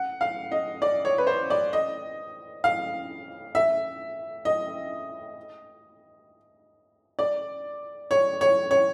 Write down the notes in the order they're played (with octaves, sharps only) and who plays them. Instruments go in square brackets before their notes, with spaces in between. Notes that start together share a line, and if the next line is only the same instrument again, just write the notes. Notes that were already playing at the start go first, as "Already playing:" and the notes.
Already playing: [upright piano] F#5
F5
D#5
D5
C#5
B4
C5
D5
D#5
F5
E5
D#5
D5
C#5
C#5
C#5